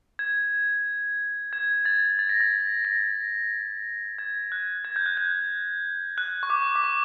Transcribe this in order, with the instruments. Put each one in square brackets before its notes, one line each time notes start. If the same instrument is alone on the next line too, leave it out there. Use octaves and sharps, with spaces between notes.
[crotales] G#6
G#6
A6
A6
A#6
A6
A#6
G#6
F#6
G#6
G6
F#6
G6
F#6
C#6
D6
D6
C#6